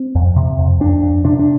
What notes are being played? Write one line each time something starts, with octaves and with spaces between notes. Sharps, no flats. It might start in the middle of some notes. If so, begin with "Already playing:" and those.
Already playing: C4
F2
C3
F2
F2 D4
F2
C3 D4
D4